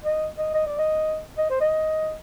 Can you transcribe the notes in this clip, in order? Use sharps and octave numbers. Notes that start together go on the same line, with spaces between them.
D#5
D#5
D#5
D5
D#5
D#5
C5
D#5